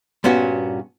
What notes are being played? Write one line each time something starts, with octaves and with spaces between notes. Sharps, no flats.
G2 A#2 B3 C#4 F#4